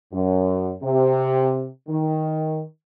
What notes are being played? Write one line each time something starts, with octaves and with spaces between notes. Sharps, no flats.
F#2
C3
D#3